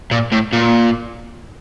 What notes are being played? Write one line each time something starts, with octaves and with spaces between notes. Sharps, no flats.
A#2
A2
A#2